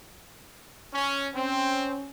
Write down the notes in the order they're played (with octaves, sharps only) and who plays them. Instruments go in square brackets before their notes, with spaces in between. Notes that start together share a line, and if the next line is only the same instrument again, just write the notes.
[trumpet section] C#4
[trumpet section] C4 [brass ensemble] C#4